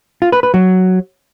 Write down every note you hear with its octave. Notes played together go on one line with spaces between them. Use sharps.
F4
B4
B4
F#3